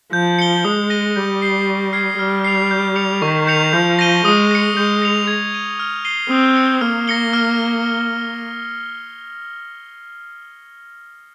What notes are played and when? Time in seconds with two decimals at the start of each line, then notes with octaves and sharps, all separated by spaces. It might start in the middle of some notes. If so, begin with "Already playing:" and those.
0.12 F3 G6
0.39 C#7 G7
0.64 G#3 D#6
0.90 A#6 D#7 G7
1.16 G3 G6
1.42 C7 G7
1.67 C#6
1.93 F6 G#6 C7
2.19 G3 F6
2.44 C7 F7
2.71 G6
2.96 C#7 F7
3.22 D#3 C#6
3.47 G6 C#7 F7
3.73 F3 G6
3.99 A#6 D#7 G7
4.25 G#3 D#6
4.51 A#6 C#7
4.77 G#3 G6
5.02 A#6 C#7 F7
5.27 G#6
5.54 D#7 G7
5.79 F6
6.05 C7 D#7 G7
6.30 C4 D#6
6.56 A#6 C#7
6.81 A#3 F6
7.08 A#6 C#7 G7
7.33 F6